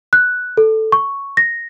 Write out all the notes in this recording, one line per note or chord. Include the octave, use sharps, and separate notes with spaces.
F#6
A4
C#6
A#6